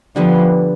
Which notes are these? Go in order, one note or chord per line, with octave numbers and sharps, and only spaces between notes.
D3 F3 G3 B3